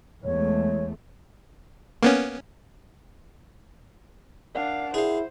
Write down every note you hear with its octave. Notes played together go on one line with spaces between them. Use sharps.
E2 G#3 A3 C#5
A#3 B3 C#4
D4 A#4 D5 F5 F#5
E4 G#4 C5 F5